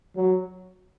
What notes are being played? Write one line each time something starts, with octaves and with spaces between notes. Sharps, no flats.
F#3